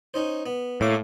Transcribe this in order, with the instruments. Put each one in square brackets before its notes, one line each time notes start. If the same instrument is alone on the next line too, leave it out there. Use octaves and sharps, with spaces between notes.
[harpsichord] C#4 D#4 C5
B3
[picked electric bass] A2 [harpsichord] A#3 D6